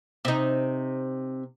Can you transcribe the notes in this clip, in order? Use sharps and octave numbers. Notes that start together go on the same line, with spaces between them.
C3 D#4